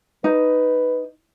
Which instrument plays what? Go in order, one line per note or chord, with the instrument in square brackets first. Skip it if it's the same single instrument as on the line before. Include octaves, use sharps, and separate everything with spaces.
[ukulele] D#4 [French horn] B4